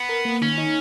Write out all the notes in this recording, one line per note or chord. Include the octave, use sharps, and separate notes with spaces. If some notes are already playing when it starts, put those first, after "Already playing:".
Already playing: B3
A#4
A#3
D#3 C#4
D#4